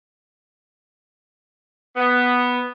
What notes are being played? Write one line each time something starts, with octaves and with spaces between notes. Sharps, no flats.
B3